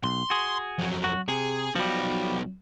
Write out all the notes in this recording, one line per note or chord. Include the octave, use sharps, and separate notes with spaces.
B1 C6
F#4 G#4
F2 F#3
F#4
C3 G#4
B1 F3 G3 F#4